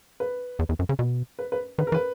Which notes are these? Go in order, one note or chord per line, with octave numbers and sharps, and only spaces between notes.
B4
E2
E2
F#2
C#3
B2
B4
B4
D#3 B4
A#4
E3 B4